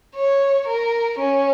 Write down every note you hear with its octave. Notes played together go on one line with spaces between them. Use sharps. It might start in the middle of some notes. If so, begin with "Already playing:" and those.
C#5
A#4
C#4